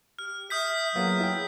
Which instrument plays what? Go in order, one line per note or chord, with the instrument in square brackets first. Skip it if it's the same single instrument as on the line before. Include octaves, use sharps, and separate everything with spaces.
[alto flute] G4 [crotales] F6
[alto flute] E5 [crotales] D#6 G6 B6
[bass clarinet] F#3 [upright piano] A#3 B3 F4 [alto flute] G#4
[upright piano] E4 G5